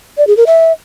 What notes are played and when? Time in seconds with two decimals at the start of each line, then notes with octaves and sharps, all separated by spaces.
0.18 D5
0.27 G#4
0.37 A#4
0.47 E5